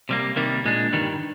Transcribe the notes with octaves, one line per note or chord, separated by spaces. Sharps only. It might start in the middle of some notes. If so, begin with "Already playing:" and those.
C3 G3 A#3
C3 D#3 G3 A#3
A#2 G#3 D4
G2 D#3 G3